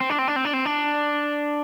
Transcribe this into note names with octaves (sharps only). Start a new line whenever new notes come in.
C4
D4
C4
D4
C4
D4
C4
D4